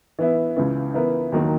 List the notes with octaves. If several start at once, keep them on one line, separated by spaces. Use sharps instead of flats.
E3 B3 E4
C#2 C#3 E3
E3 B3 E4 A#4
D#2 D#3 F#3 A#3